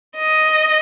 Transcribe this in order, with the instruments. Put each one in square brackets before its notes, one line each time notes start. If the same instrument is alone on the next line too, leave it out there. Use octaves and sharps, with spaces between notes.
[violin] D#5